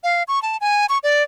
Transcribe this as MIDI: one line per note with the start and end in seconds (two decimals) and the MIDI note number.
0.04 0.23 77
0.28 0.42 85
0.42 0.57 81
0.61 0.86 80
0.89 0.98 85
1.03 1.23 74